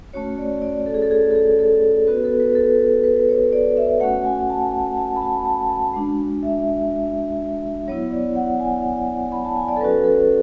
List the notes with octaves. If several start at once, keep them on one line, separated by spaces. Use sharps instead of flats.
A3 C#4 F#4 C#5
D5
D5
A4
G#4
A4
G#4
A4
G#4
A4
B3 F#4 B4
A4
B4
A4
B4
C#5
D5
E5
A3 C#4 F#4 F#5
G#5
A5
A5
B5
A5
A5
A5
G#3 D4 F#4
E5
F#3 B3 E4 C#5
D5
F#5
G#5
B5
A5
G#5
D5
A4
F#3 C#4 F#4 B4
A4